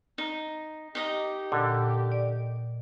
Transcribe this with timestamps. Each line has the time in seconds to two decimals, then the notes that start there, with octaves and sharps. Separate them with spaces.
0.18 D#4
0.95 D#4 G4 D#5 A#5
1.52 A#2 D3
2.12 D5